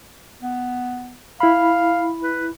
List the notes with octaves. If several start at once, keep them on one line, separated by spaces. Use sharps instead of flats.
B3
E4 F5 B5
B4